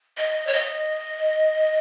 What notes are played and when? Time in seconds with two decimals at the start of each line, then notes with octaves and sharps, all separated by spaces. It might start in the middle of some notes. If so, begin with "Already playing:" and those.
0.17 D#5
0.47 C#5
0.53 D#5